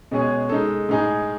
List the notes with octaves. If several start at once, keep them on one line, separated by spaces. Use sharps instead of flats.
B2 G#3 C#4 G#4
G#3 D#4 A4
A2 G#3 D#4 G#4